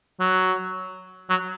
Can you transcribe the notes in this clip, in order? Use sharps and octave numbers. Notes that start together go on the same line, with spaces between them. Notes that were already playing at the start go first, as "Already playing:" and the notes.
F#3
F#3